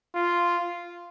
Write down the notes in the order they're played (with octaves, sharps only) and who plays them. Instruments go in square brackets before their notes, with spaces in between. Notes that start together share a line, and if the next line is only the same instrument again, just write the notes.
[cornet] F4